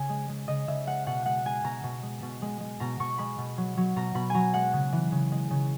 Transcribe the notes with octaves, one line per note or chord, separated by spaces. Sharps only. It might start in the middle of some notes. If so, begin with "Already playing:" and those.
Already playing: C#3 G#5
G#3
G#3
C#3 D#5
C#3 E5
G#3 F#5
B2 F#5
G#3 F#5
G#3 G#5
B2 A#5
B2
G#3
B2
G#3
G#3
B2 A#5
B2 C#6
G#3 B5
B2
F#3
F#3
B2 A#5
B2 B5
F#3 G#5 A#5
G#3 F#5
C#3
E3
C#3
G#3
C#3